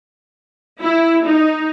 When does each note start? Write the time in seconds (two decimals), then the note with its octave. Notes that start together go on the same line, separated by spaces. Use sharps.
0.81 E4
1.25 D#4